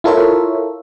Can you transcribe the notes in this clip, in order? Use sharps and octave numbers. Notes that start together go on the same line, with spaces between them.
E4 F4 A4 A#4 C#5 E5